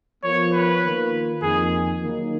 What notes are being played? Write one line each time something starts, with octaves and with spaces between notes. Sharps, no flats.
F3 B3 F4 A#4 C#5
B4
D#3 A#3 F4 A#4
F2 D#3 A#3 D#4 G#4
D#3 F#3 A#3 D#4